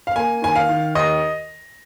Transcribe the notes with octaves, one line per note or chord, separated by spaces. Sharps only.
F5
A#3 G#5
D#3 G#5
F5
D#3
D#2 D#5